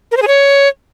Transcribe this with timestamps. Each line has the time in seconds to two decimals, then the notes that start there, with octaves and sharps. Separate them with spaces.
0.12 A#4
0.17 C5
0.22 G#4
0.28 C#5